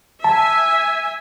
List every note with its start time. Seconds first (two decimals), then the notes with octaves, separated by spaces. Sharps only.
0.24 E5 G#5 A5